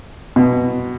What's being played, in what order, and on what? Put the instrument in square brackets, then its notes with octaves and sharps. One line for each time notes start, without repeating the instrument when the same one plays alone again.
[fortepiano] B2